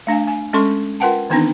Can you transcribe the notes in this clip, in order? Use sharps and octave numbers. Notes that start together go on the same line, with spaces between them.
A3 D4 F5 G#5
G#5
G#3 C#4 A4 C6 C#6
F4 A#4 B4 F#5 G5 A5
D#3 E3 B3 C4 D4 D#4